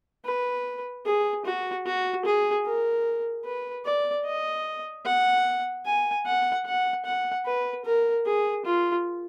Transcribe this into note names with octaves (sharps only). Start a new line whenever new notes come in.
B4
G#4
F#4
F#4
G#4
A#4
B4
D5
D#5
F#5
G#5
F#5
F#5
F#5
B4
A#4
G#4
F4